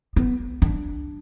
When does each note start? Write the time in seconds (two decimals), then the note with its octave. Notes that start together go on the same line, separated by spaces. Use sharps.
0.16 B3
0.62 D4